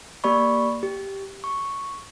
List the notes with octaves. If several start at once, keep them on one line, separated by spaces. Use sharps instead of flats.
A#3 G4 D5 B5 C#6
G4
C#6